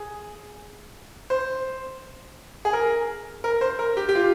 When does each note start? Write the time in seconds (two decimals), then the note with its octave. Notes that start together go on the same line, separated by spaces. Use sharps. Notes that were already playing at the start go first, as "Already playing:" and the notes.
Already playing: G#4
1.30 C5
2.65 G#4
2.73 A#4
3.44 A#4
3.61 C5
3.79 A#4
3.97 G4
4.09 G4
4.15 F4